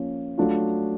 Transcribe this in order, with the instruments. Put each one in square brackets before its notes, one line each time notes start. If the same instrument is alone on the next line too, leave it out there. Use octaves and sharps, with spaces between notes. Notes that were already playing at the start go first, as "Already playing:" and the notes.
Already playing: [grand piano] F3 A#3 C#4
F#3 A3 D4 F4